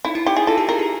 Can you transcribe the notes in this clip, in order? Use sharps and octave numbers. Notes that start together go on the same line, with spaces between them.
D#4 E4
E4
D#4 G4
E4 G#4
F4 A4
G4
G#4 A#4
G4